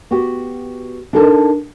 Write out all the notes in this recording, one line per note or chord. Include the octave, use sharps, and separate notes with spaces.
B3 F#4 G4 G5
D4 D#4 A4 A#4 A5